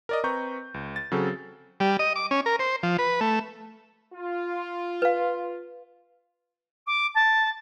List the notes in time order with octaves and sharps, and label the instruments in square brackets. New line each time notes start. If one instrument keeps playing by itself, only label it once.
[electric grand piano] A#4 D5 D#5
C4 B4 A#5 C#6 G6
C#2
A6
C#3 F#3 C4 A4
[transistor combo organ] G3
D#5
D6
C#4
A#4
C5
F3
B4
A3
[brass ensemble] F4
[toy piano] B4 F5
[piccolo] D6
A5